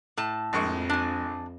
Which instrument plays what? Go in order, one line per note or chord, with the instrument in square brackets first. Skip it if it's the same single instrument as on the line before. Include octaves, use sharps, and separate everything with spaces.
[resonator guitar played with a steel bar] A2 A5
[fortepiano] A#1 G#3 C#6 [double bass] F2
[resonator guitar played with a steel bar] D4 G#5